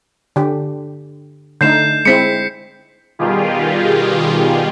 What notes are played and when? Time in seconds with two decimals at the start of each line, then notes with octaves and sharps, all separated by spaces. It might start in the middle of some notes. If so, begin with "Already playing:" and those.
0.36 D3 G4
1.61 D3 A3 D#4 G6 C7 E7
2.05 G#3 C4 E4 B6 C#7
3.19 B2 D#3 G3 F4 G4 G#4